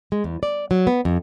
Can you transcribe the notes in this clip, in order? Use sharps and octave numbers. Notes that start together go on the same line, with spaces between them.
G#3
E2
D5
F#3
B3
F2